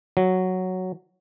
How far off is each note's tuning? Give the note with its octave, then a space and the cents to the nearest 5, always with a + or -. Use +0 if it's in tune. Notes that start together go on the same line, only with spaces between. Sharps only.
F#3 +0